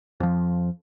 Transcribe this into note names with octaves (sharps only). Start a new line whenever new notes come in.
F2 F3